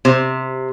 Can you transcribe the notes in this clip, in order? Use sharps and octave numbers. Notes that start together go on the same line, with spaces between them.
C3